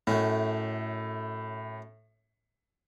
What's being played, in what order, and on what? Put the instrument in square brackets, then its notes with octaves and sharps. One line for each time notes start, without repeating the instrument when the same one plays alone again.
[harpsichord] F#2 A3 C#4 [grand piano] A2